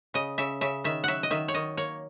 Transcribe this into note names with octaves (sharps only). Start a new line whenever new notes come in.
C#3 D#5
C#3 E5
C#3 E5
D#3 E5
F#3 E5 F#5
D#5
D#3 E5
C#5
D#3 D#5
A#3 C#5